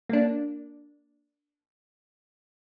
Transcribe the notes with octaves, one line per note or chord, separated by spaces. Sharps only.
A#3 D4